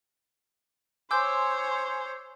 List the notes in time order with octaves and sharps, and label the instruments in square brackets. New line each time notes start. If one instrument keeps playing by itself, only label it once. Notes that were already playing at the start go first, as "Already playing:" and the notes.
[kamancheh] C5 C#5 [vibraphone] G#5 C6 [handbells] D6 E6 G6